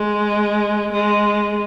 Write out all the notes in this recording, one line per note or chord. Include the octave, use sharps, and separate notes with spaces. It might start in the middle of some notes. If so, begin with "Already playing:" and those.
Already playing: G#3
G#3